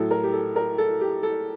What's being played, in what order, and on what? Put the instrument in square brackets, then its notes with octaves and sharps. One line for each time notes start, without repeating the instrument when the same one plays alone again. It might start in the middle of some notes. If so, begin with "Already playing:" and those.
Already playing: [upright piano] A2 F#3 A4
A#4
G4
A4
A#4
A4
G4
A4